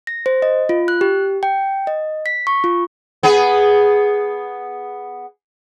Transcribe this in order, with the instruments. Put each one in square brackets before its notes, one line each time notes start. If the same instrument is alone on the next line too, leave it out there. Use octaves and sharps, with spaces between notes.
[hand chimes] A#6
C5
D#5
F4
F#6
G4
G5
D#5
B6
C#6
F4
[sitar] B3 G#4 B4